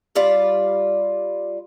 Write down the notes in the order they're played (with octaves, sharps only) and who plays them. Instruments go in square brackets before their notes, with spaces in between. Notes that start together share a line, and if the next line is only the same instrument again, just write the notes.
[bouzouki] G3 F4 D5